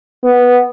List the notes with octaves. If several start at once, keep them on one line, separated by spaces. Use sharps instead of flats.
B3